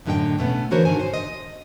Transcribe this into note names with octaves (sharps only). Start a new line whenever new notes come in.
F#2 A2 D3 G4 D#5 G5
B2 A3 B3 C#4
D3 E3 F#4 A#4 C5 C#5
G#2 D3 D#3 G#5
C5
D#5